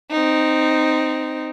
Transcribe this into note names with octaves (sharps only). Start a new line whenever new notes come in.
C4 D#4